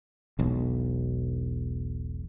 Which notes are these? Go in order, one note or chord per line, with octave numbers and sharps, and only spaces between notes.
E1 B1